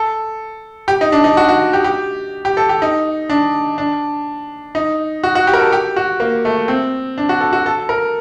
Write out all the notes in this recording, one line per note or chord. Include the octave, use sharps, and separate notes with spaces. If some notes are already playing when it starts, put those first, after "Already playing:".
Already playing: A4
G4
D#4
D4
D#4
F#4
F#4
G4
G4
G4
A4
G4
D#4
D4
D4
D#4
F#4
F#4
G4
A#4
A4
G4
F#4
A#3
A3
C4
D4
F#4
A4
F#4
A4
A#4